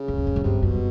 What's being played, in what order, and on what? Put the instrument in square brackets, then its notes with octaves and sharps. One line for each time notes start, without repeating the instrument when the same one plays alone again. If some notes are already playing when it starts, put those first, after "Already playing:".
Already playing: [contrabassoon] C#3
[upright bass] F2
E2
F2
F#2
[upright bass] G2 [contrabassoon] C3
[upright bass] F#2 [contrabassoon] B2